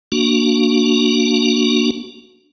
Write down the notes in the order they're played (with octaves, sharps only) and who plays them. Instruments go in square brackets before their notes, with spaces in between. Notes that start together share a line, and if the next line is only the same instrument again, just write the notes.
[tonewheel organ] A#3 D4 F#4